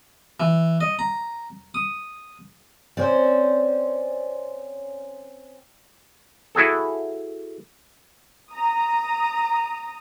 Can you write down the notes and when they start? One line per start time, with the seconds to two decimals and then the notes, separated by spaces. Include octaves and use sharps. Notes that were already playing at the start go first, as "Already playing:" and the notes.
0.40 E3
0.81 D#5
0.99 A#5
1.74 D#6
2.97 C4 C#4 C5 D5
6.55 E4 F#4 G#4 A4
8.51 A#5 D#6